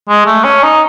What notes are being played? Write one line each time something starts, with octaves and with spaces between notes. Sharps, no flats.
G#3
A3
C#4
D#4